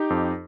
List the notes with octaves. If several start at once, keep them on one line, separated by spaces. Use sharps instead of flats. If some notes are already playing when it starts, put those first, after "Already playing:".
Already playing: D#4 G4
F2